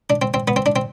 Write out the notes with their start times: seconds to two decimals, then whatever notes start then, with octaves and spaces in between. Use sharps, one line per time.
0.10 D4
0.22 C4
0.34 C4
0.48 B3
0.56 C4
0.66 D4
0.76 C4